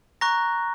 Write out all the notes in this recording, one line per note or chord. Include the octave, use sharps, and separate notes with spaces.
A#5 C#6 F#6 A#6